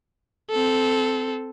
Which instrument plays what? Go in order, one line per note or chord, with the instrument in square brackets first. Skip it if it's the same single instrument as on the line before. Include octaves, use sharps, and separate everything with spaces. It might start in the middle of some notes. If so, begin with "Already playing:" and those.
[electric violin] C4 A4